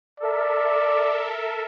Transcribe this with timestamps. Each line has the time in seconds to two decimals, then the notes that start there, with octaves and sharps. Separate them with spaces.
0.20 A4 A#4 D5 E5